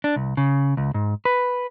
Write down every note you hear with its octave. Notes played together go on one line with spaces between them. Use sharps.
D4
C2
C#3
C#2
G#2
B4